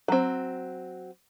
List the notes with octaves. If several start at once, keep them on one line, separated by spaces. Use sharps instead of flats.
F#3 C4